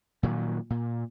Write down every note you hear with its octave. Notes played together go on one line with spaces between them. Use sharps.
A#2 D#3 F#3
A#2